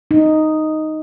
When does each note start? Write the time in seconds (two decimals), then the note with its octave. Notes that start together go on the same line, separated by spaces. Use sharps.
0.11 D#4